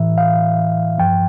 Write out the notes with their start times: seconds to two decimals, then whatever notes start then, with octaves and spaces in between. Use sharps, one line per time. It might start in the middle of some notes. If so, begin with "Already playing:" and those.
Already playing: A2 E3 E5
0.18 F5
0.98 G2 F3 G5